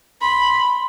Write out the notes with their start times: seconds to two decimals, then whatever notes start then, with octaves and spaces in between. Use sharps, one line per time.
0.21 B5 C6